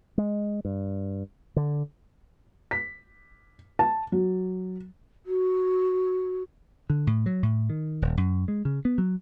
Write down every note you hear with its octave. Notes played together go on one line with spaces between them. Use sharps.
G#3
G2
D3
B6
A5
F#3
F#4
D3
A2
F#3
A2
D#3
D#1
F#2
G#3
C#3
B3
F#3